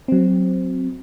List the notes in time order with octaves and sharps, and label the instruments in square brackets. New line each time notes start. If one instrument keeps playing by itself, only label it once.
[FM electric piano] F#3 C4